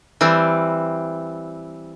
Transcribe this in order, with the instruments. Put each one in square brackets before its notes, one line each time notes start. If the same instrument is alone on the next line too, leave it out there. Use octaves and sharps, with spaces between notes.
[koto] E3 G3 C4